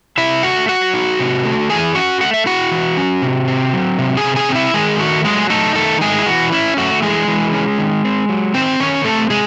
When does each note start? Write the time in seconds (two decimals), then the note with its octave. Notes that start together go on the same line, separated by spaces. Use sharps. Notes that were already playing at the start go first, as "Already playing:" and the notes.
0.18 C3 E4 E5
0.43 A3 F#4 F#5
0.69 F#3 F#4 F#5
0.94 D#4
1.19 C3
1.45 A3
1.70 E3 G#4 G#5
1.95 C#4 F#4 F#5
2.21 A3 F#5
2.34 E5
2.46 E4 F#4 F#5
2.71 E3
2.97 C#4
3.22 C3
3.48 C4
3.73 F#3
3.99 C3
4.17 G#4 G#5
4.24 C3
4.36 G#4 G#5
4.49 C4
4.55 E4 E5
4.74 D#3 G#3 G#4
4.99 A3 F#4
5.25 F#3 G#3 G#4
5.50 A3 D#4 A4
5.75 D#3 A3 A4
6.01 G#3 A3 G#4
6.19 E4
6.26 E3 F#4
6.52 C#4 E4
6.77 A3 F#4
7.02 E3 G#3 G#4
7.28 E3
7.53 C#4
7.79 D#3
8.04 C4
8.29 F#3
8.54 D#3 C4 C5
8.80 D#3 C#4 C#5
9.05 A3 C4 A4
9.30 C3 G#3 G#4